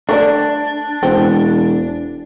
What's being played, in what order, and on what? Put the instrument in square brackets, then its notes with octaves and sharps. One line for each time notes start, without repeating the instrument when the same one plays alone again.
[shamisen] A3 A#4 D5 [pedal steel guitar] D4
[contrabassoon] E1 [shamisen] C4